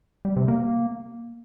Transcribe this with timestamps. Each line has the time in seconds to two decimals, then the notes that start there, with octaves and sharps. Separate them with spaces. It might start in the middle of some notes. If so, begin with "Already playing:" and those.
0.25 G3
0.36 C3
0.48 A#3